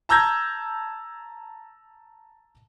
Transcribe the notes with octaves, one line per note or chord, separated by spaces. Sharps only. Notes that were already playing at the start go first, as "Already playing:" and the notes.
A5 A#5 E6 G6 G#6 A#6